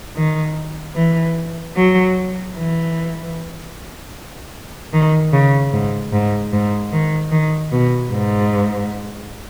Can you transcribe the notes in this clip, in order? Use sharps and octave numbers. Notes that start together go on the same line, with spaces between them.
D#3
E3
F#3
E3
D#3
C#3
G#2
G#2
G#2
D#3
D#3
B2
G#2